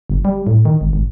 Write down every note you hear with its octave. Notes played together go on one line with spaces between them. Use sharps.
G1
G3
A2
D#3
G#1
G#1